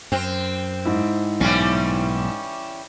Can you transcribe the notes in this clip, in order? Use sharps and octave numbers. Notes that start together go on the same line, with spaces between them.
F#2 C4
G#2 E4
B1 A2 E3 G3 C#4